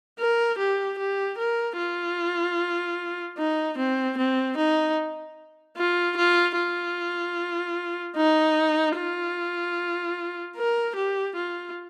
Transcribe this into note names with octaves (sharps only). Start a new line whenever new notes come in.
A#4
G4
G4
A#4
F4
D#4
C4
C4
D#4
F4
F4
F4
D#4
F4
A#4
G4
F4